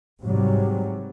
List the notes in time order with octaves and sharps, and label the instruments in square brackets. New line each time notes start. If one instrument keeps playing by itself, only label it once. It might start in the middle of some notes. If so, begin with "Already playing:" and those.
[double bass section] G#2 C3 F#3 G3